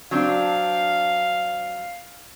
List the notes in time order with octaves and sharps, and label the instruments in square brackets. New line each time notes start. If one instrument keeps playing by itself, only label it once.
[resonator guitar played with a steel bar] F#3 C4 D4 [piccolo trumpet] F5